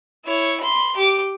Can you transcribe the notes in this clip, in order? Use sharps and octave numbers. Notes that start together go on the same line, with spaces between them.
E4 C#5
B5 C6
G4 D6